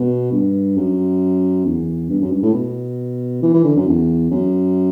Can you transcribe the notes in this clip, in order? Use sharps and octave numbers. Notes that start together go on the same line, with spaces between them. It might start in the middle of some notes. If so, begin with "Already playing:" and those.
Already playing: B2
G2
F#2
E2
G2
F#2
G2
A2
B2
E3
E3
D3
F#2
E2
F#2